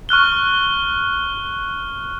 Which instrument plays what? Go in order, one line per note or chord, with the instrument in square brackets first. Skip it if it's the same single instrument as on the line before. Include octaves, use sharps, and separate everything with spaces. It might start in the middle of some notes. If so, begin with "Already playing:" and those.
[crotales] C#6 F6 F#6 G7